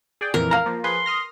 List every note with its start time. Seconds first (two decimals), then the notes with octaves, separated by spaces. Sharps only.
0.21 G#4 D5 G5
0.34 F2 A#2 E3 A#4
0.51 F5 A#5
0.66 F3 A#3
0.84 F3 G#4 B4 C6
1.06 D#6 F6 A#6